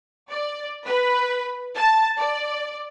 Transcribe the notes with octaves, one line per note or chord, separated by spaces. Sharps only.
D5
B4
A5
D5